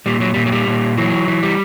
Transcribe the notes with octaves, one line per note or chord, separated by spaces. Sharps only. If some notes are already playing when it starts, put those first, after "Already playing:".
A#2 G3
F#3
A#2 G3
F#3
G3
A#2
E3 F#3
E3
G3